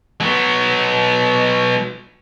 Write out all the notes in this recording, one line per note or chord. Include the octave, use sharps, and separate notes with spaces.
F#3 B3